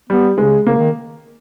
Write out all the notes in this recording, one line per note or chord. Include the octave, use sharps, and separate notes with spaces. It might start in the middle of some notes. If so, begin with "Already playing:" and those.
G3 B3
C#3 G#3
C#3 A#3
D#3